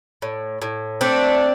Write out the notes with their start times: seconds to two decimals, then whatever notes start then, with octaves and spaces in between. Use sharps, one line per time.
0.22 A2
0.62 A2
1.01 A3 C4 D4